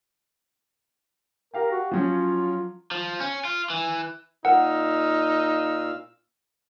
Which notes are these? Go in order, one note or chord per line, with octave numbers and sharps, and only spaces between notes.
G4 A#4 F5 G5
F#4
F3 F#3 C#4 F4
F3
C#4
F4
E3
A#2 D#4 A#4 F5 F#5 E6